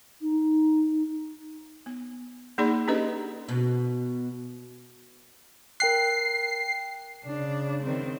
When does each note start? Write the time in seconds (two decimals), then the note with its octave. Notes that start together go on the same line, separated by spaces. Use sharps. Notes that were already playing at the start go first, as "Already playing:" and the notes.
0.22 D#4
1.86 B3
2.58 A#3 D#4 G#4 D5 B5
2.88 C#4 D4 G4 A4 B4 D#5
3.48 B2
5.80 A#4 G5 F#6 C7
7.25 C#3 D4
7.84 D#3 C4